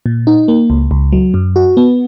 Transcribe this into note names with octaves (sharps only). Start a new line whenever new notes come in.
A#2
D#4
A#3
C#2
C#2
F#3
F#2
F#4
B3